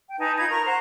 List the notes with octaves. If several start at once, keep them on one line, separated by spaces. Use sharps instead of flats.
G5
D#4 B4 G#5 A5
D#4 F4 B5 G#6
A#4 A#5 C#6
C5 F#5 A#5